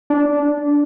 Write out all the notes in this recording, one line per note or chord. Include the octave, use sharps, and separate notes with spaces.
D4